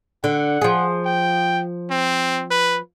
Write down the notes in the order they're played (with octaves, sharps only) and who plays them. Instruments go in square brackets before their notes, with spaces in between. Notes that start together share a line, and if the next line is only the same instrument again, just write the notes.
[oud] D3 [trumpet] F#5
[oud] F3 G#4
[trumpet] G5
C4
B4